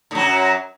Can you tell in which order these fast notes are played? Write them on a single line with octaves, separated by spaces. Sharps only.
A2 F#3 F#2